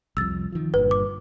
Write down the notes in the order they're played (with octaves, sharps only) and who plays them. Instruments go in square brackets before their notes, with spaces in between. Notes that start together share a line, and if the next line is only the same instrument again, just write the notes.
[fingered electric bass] C2 F2 [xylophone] E6 A6
[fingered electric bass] D#3 F3
[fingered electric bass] G1 G2 A#2 [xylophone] B4
[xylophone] D6